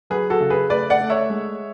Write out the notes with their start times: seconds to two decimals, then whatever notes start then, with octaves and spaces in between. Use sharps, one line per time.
0.10 F#3 G#4 B4
0.30 F#4 A4
0.40 C#3
0.50 G#4 B4
0.70 A3 B4 D5
0.90 D5 F#5
1.00 A3
1.10 C#5 E5
1.30 G#3